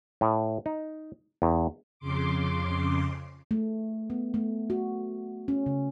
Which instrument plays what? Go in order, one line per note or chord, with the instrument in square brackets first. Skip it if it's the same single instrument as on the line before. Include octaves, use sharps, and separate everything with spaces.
[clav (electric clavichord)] A2
D#4
E2
[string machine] F2 C#3 C6 D6
[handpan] A3
B3
A3
F#4
C#4
C#3